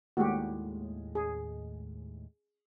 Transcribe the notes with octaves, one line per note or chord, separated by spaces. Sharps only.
D#2 A2 G#3 F#4 G4
G#4